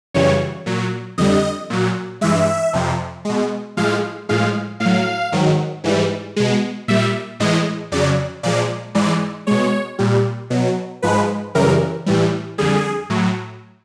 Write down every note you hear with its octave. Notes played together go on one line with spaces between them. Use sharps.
F#2 C#3 E3 G3 C#5
A#2 F#3
F2 D3 G3 D#5
A#2 F#3
G2 E3 G#3 E5
F2 C3 F3
B2 G#3
A2 F3 G#3 F5
A2 F3 G#3 F5
A2 F5
F#3
G#2 D#3 F#3
G#2 E3 G3
B2 G#3
A#2 G3 E5
A2 E3 G#3 D#5
F2 C#3 F#3 D5
A#2 F3 G#3 D5
G#2 E3 G#3 D5
B2 G#3 C#5
A#2 G3
B2 F#3
G#2 F3 G#3 B4
F#2 C#3 E3 G3 A#4
A2 E3 G3
F2 D3 G3 G#4
A2 F#3